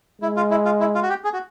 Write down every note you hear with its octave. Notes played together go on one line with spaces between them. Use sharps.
G#3 E4
F4
E4
F4
E4
F4
F#4
G4
G#4
F#4